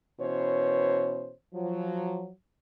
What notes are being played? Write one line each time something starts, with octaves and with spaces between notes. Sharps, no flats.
B2 E3 C#4 C5 C#5
F3 F#3